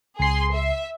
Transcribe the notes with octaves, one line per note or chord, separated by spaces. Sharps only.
C#2 G#4 C6 C7
E5